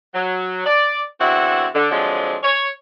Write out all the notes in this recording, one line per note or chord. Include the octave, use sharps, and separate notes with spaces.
F#3
D5
E2 D3 C4 E4 F#4 F#5
D3
D3 F3 F#3 G#3 C4 D4
C#5